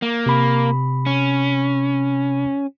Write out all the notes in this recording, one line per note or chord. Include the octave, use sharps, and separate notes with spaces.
A#3
C3 B5
C#4